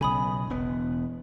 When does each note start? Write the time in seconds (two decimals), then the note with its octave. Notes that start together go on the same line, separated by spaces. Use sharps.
0.01 B1 C#3 G#5 B5 D#6
0.50 E1 B3